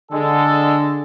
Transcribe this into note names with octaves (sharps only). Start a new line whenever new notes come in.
D3 G#3 A4